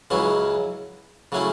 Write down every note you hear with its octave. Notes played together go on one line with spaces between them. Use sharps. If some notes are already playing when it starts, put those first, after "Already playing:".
C#2 C#3 F#3 C#4 E4
C#3 F#3 A3 C#4 E4